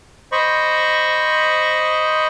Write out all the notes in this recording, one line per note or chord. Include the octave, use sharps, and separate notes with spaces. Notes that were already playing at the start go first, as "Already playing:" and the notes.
C5 D#5 B5 C#6